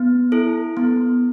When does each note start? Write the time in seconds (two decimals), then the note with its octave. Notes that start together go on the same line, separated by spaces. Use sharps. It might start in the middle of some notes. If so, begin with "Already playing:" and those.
Already playing: B3
0.32 E4 A4
0.77 B3